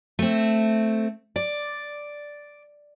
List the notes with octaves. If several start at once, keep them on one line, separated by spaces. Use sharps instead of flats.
A3 C4
D5